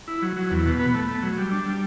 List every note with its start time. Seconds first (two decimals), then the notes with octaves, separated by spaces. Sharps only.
0.08 E4
0.22 F#3
0.37 F#3
0.51 E2
0.66 B2
0.79 B3
0.94 A3
1.08 A3
1.23 F#3
1.38 G3
1.51 D4
1.66 G3